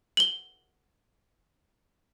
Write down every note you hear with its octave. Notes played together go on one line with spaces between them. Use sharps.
F#7 G7